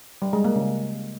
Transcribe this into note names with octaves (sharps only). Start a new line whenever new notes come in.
G3
G#3
A#3
C#3